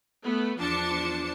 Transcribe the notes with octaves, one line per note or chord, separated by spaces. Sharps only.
A3 B3
E2 F3 D4 A5 C#7